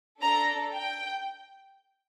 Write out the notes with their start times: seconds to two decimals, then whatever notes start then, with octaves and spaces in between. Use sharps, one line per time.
0.21 D4 A4 A#5
0.74 G5